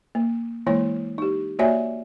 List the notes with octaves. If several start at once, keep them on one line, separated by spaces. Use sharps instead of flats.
A#3
E3 G#3 A#3 E4 C#5
D#4 G4
A#3 F#4 C#5 D5 E5 G#5